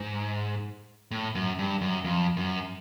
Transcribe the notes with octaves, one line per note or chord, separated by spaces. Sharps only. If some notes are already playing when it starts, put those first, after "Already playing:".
Already playing: G#2
A2
F#2
G2
F#2
F2
F#2